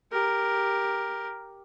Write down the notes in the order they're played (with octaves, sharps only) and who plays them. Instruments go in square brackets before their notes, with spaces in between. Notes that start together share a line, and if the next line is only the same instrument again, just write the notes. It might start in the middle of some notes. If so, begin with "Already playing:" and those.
[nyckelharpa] G4 A#4